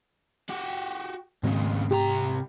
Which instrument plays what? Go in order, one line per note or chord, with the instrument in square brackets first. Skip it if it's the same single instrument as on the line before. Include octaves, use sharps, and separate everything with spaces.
[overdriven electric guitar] F#4 G4
[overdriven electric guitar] D#2 C#3 [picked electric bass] G#2 A3 C4
[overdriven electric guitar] C2 A#5 [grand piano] G4